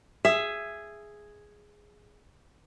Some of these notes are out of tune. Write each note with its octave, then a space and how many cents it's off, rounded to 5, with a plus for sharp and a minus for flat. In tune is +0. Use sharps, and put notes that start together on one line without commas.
G#4 +0 E5 +15